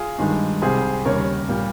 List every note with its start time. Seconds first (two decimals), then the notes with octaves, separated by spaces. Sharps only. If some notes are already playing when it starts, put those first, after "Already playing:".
Already playing: F4 G#4
0.18 G2 D#3 G#3
0.62 C2 C3 G3 G#4 C5
1.05 D#2 C#3 G3 A#4 C#5
1.48 A#2 G3 A#3